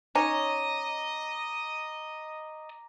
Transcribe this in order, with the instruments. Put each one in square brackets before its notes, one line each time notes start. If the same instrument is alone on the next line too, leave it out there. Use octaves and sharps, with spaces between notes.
[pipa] C#4 D#4 C#5 [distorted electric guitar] D#5 [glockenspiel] A#5 D6 A#6